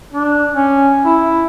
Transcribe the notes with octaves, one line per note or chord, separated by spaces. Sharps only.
D4
C#4
E4